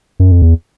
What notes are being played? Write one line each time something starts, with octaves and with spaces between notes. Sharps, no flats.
F#2
F2
E2